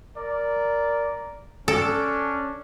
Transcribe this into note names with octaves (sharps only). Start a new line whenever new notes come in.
A#4 D5
C#4 D4 A4